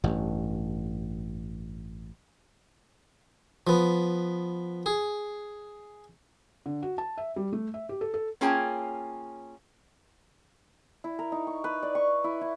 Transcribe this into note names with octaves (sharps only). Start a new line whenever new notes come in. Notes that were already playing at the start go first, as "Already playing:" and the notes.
A1 G2
F3 B3
G#4
D3
F#4
A5
E5
G3
A3
E5
G4
A4
A4
A#3 C#4 F4 G#4 G5 A5
E4
A#4
D#4
C#6
B4
D5
C#6
E4
E4